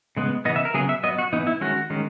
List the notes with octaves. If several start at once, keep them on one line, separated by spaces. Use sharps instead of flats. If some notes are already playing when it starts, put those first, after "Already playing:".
C#3 G#3 B3
C#3 E3 B3 D#5
E5
A#4
C#3 F#3 B3 G#4
E5
F#3 B3 D#5
F#4
E3 B3 D#4
E4
D#3 G#3 C#4 F#4
D#3 G#3 C#4